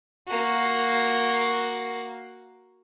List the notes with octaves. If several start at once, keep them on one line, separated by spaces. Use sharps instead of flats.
A#3 F#4